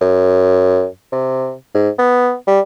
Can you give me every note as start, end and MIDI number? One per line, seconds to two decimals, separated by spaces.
0.01 0.86 42
1.12 1.54 48
1.74 1.90 44
1.99 2.35 59
2.47 2.61 55